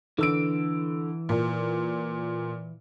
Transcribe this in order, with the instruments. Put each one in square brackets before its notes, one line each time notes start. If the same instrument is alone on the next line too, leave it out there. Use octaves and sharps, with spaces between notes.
[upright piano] D3 E6 D7 [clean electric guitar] E3
[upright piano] A#2